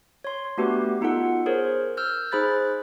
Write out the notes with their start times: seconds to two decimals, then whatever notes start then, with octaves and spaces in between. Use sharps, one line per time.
0.24 C#5 C6
0.58 A3 B3 D4 F#4 G4 B4
1.01 B3 D#4 F4 A4 F#5
1.46 G#4 A#4 C5 C#5
1.97 E6 F6 G6
2.32 D#4 G#4 C5 B5 F#6 A6